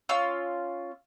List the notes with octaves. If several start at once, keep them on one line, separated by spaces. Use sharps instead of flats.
C#4 F4 E6